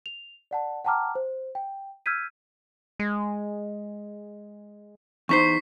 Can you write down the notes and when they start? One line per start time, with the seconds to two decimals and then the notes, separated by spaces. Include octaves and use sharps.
0.06 F7
0.51 D5 F#5 A5
0.85 F#5 G5 A5 A#5 D6 F6
1.15 C5
1.55 G5
2.06 E6 F6 G6 G#6 B6 D#7
2.99 G#3
5.29 E2 D#4 C5 C#6 B6 C7